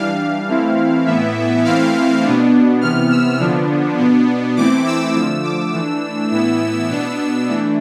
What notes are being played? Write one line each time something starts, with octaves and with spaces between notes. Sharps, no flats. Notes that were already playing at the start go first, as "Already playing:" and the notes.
Already playing: E3 G3 D4 F5
E3 A3 C4 E4
A2 E3 B3 E4 E5
E3 A3 C4 E4 F5
B2 B3 D4
C3 E3 B3 F6
E6
D3 F3 B3 D4
B2 B3 D4
E3 A3 C4 E4 D6
E6
D3 F3 A3 E6
D6
E3 A3 D4 E6
A2 E3 B3 E4 E6
B2 B3 D4
E3 A3 D4